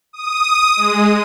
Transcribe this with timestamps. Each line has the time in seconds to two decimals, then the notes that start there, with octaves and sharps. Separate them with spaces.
0.13 D#6
0.76 G#3